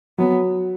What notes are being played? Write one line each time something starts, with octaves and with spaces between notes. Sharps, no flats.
F#3 B3